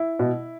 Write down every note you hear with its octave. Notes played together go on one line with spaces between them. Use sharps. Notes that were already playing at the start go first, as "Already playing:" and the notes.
Already playing: E4
B2